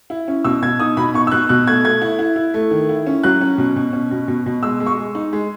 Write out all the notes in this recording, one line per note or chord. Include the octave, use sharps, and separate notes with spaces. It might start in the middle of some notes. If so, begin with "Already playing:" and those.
E4
C#4
B2 E6
B2 G#6
D#4 D#6
B2 B5
D#4 C#6
E6
B2 F#6
B2 F#6
A3 G#6
A3 G#6
E4
E4
E4
A3
D#3
E4
C#4
F#3 F#6
C#4
B2
B2
C#4
B2
B2
B2
G#3 E6
G#3
C#6
G#3
D#4
G#3